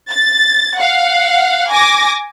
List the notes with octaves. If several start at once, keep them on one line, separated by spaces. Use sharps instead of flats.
A6
F5 F#5
G#5 D6 A#6